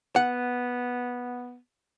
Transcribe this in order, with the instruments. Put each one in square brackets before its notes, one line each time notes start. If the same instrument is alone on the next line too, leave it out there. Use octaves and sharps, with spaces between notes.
[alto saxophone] B3 [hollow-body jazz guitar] F#5